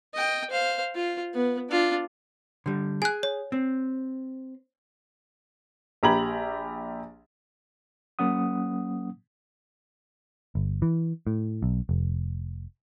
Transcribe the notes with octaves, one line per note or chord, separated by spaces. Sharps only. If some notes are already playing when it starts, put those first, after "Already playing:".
D#5 G5
C5 F5
F4
B3
D4 F4
D3 G3
G#4 G#5 F#6
C#5
C4
A#1 G4 A#5 B5 G#6 F#7
F#3 A#3 C#4 F#5 D#6
G1
E3
A2
B1
F1